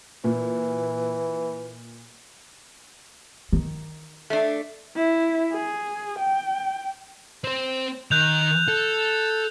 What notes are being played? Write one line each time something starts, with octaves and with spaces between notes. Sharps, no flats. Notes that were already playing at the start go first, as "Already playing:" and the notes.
A#2 E3
D#3
A3 D4
E4
G#4
G5
C4 C5
D#3 F#6 G6 F7
A4